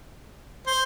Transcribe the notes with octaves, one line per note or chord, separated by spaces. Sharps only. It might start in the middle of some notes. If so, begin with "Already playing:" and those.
C5